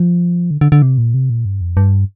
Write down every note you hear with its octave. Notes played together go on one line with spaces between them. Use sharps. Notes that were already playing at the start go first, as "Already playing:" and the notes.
Already playing: F3
D3
D3
D3
C3
A#2
C3
A#2
G2
F2
G2